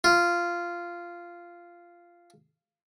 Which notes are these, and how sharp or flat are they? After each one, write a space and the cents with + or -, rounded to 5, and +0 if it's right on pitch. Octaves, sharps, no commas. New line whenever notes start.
F4 -10